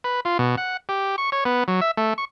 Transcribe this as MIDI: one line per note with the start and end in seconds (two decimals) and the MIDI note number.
0.04 0.20 71
0.25 0.38 65
0.39 0.56 47
0.58 0.77 78
0.89 1.16 67
1.18 1.30 85
1.32 1.44 73
1.45 1.64 59
1.68 1.81 54
1.81 1.91 76
1.97 2.14 57
2.18 2.25 85